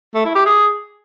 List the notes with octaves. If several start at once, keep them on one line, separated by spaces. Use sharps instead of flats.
A3
E4
G4
G#4